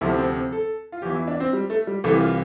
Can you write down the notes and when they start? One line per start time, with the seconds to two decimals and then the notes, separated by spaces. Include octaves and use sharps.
0.01 D2 C3 F3 E4
0.19 C4
0.35 C4
0.52 A4
0.92 F4
1.02 E2 E3 G4
1.15 E4
1.28 D4
1.40 C4
1.53 G3
1.70 A3
1.87 G3
2.04 C2 C3 E3 A3
2.20 F4